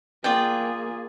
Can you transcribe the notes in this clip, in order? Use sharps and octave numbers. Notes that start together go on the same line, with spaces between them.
A#3 F4 G#4 D5 G5